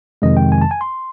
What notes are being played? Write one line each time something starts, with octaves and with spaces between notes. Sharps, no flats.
F2 C3 D#3 G#3 D#5
G5
G#5
A5
G#5
C6